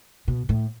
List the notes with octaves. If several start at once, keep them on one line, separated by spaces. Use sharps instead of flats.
B2
A2